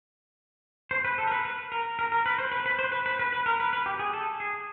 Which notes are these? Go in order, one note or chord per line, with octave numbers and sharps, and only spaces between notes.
C5
B4
A4
A#4
B4
B4
A#4
A#4
A#4
B4
C5
B4
B4
C5
B4
B4
B4
B4
A#4
B4
B4
G4
G#4
A4
G#4